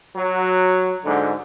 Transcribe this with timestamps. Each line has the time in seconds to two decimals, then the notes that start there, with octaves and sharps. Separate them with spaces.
0.15 F#3
1.04 G#2 D3